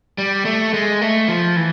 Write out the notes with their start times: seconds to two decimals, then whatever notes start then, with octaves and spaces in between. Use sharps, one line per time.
0.18 G3
0.45 A3
0.74 G#3
1.02 A3
1.28 F3
1.56 E3